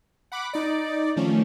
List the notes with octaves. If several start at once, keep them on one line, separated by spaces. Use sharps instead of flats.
F#5 B5 D6
D#4 D5
D#3 F3 A3 C#4